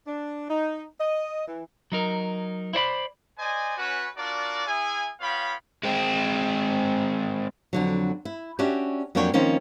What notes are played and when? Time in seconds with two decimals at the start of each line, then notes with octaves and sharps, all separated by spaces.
0.07 D4
0.50 D#4
1.01 D#5
1.48 E3
1.92 F#3 D#4 A#4
2.73 E4 C5 D5 B5
3.39 C5 D5 D#5 G#5
3.78 C#4 F#4 B4
4.16 D4 F4 F#4 A#4 D5
4.67 E4 G#4 G#5
5.20 B3 F4 C#5 F5 G5 B5
5.83 G#3 C4
7.73 F2 D3 F#3
8.25 E4
8.59 C#4 D4 F#4 G4 E5
9.15 F2 F#3 A#3 D4 C#5 G5
9.34 D#3 F3 A#3 C4 C#4 D#4